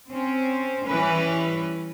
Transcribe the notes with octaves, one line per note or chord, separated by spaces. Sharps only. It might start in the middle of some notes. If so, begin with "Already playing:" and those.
C4 C#4
E3 G3 C#4 B4